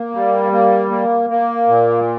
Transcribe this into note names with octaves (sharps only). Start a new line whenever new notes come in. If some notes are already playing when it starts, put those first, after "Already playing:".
Already playing: A#3
G3
A#3
A#3
A#3
A#2